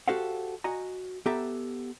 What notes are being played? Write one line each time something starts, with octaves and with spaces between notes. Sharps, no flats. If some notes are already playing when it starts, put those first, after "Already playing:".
F#4 G4 A4 C5 F5 F#5
F#4 D#5 G#5 A#5
B3 G4 A4 E5 A#5